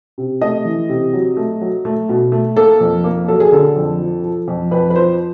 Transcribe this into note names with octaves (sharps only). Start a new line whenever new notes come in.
C3
A3 D#5
E3
C3
F#3
A3
F#3
A3
B2
A3
A#3 A4
F2
A#3
F#3 A4
G#4
D3 A4
F2
F3
F3
F2
F2 B4
B4
F3 C5